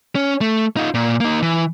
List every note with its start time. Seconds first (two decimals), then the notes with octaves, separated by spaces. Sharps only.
0.15 C#4
0.41 A3
0.77 D#4 F4
0.94 A#2
1.20 A#3 D#4
1.42 E3